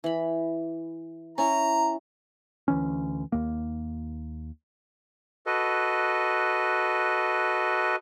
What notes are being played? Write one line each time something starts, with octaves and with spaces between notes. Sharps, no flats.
E3 B5
C#4 E4 A#5
D2 E3 C#4
D#2 A#3
F#4 A4 B4 D#5